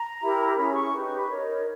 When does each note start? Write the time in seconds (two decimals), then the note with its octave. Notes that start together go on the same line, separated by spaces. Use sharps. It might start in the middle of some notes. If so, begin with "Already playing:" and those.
Already playing: A#5
0.21 E4 G4 A#4
0.57 C#4 E4 G#4 B5
0.75 C#6
0.93 D#4 G4 B4
1.05 C#6
1.17 B5
1.29 D#4 A#4 C#5